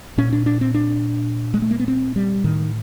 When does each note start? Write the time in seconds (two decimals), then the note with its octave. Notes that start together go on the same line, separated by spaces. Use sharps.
0.18 A#2 C#4
0.33 D4
0.46 D4
0.61 C4
0.75 D4
1.54 G#3
1.62 A3
1.71 A#3
1.80 B3
1.88 C4
2.16 G3
2.44 A2 D#3